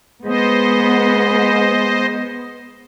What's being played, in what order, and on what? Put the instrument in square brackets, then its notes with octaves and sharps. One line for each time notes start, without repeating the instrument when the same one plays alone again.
[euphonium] G#3 [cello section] B3 [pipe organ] C5 D#5